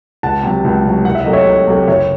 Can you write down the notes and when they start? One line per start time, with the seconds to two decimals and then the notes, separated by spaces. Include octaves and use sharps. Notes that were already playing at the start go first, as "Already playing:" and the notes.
0.23 C#2 F#5 A5
0.43 C3 F#3
0.64 C#2
0.85 C3 F#3
1.05 C2 F#5
1.15 E5
1.24 C3 F#3 A3 D#5
1.33 C#5 E5
1.47 C2
1.67 C3 F#3 A3
1.88 F#1 C#5 E5